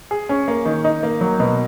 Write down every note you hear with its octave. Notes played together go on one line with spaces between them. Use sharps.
G#4
C#4
A#3
D#3
D#4
A#3
F#3
B2